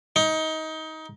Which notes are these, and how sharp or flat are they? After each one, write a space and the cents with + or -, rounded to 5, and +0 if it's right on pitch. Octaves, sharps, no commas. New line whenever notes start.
D#4 +25